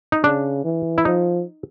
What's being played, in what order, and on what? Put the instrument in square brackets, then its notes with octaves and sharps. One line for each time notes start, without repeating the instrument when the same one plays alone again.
[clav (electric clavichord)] D#4
[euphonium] C#3 [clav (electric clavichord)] D4
[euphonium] E3
[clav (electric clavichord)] E4
[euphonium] F3 [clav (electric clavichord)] D#4